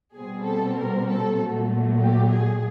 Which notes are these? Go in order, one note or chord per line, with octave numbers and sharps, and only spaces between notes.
B2 G3 C4 G#4
A4
A#4
A4
A#2 F#3 A3
G4
G#4